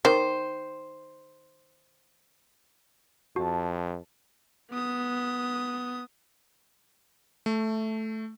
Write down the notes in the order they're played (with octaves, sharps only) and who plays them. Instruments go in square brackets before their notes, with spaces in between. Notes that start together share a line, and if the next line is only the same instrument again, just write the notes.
[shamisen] D#3 [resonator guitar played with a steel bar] C5
[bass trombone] F2 [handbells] F#4 [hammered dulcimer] A5
[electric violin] B3 D#6
[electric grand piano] A3